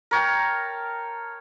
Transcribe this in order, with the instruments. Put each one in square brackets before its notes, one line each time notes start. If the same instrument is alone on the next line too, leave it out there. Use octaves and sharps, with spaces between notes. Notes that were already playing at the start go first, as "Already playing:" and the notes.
[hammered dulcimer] A#4 C#5 G5 A5